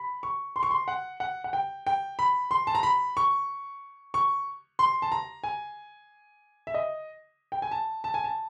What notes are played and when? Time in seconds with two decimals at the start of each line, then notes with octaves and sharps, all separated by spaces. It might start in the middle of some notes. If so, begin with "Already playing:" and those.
Already playing: B5
0.23 C#6
0.56 C6
0.63 C#6
0.71 C6
0.88 F#5
1.20 F#5
1.44 F#5
1.53 G5
1.87 G5
2.19 B5
2.51 C6
2.67 A5
2.75 A#5
2.83 B5
3.17 C#6
4.14 C#6
4.79 C6
5.02 A5
5.12 A#5
5.44 G#5
6.67 E5
6.74 D#5
7.52 G5
7.62 G#5
7.71 A5
8.04 A5
8.14 G#5
8.24 A5